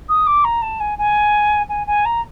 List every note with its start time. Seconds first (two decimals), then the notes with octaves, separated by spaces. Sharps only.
0.09 D#6
0.27 D6
0.44 A#5
0.62 A5
0.80 G#5
0.98 G#5
1.69 G#5
1.87 G#5
2.05 A#5